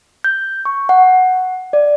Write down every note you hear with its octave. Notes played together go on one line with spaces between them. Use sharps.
G6
C#6
F#5
D5